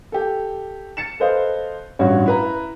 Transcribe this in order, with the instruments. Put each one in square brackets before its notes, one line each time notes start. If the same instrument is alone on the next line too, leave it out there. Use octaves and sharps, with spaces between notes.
[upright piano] G4 A4
A6 C#7 E7
A4 B4 C5 D#5 F5
A1 G2 F#4 C#5
E4 B4 A#5